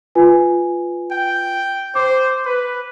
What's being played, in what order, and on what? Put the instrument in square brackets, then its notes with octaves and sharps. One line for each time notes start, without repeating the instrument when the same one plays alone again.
[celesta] F4 B4 G#5
[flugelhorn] G5
[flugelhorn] C5 [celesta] D6
[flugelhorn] B4